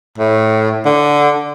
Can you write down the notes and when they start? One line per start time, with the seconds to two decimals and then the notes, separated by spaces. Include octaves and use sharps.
0.18 A2
0.85 D3